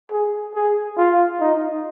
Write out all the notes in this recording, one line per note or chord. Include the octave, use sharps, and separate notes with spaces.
G#4
G#4
F4
D#4